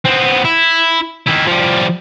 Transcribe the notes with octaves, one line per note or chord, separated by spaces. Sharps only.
B3 C4
E4
D#3 E4
F3 G3